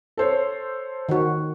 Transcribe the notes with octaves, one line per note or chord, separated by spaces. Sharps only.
A4 C5 C#5
D#3 F#4